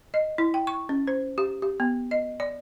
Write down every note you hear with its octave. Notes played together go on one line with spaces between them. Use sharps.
D#5
E4
G5
C#6
C#4
C5
G4
G4
B3
D#5
D5